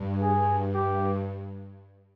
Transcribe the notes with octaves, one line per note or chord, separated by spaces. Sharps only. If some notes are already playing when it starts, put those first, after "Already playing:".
Already playing: G2
G#4
G4